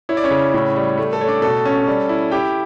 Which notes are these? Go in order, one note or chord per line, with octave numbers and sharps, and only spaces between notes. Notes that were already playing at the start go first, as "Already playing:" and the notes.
E4 C#5
D5
C#4 C#5
C#3
A2
G3
A3
A4
A3 C#5
D4 D5
B2 A4
C#4
G3
E4
E4 G4 G5